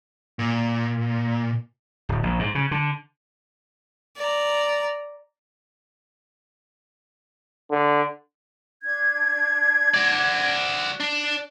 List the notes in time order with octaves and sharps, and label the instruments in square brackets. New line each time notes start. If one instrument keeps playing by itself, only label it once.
[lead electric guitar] A#2
[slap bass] D1
A#1
G#2
C#3
D3
[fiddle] D5 A#5
[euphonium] D3
[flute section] D4 G#6
[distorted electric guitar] F#4 D5
D4